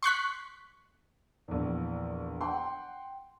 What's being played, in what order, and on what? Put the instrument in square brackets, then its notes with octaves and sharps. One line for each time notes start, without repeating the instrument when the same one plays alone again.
[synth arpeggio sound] C6 C#6 F#6 B6
[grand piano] A#1 E2
F#5 G5 C6